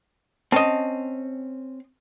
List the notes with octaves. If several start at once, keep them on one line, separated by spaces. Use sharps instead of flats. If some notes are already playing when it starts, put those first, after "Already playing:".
C4 C#4 D#5 A5